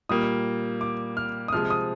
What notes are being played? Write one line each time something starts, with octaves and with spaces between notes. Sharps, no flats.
A#2 G3 A#3 D#6
D6
F6
D#6
C3 F3 G#3 F6
D#6